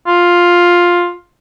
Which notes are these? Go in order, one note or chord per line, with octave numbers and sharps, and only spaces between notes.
F4